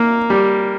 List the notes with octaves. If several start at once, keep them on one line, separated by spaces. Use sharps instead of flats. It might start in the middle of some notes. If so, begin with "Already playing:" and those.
Already playing: A#3
G3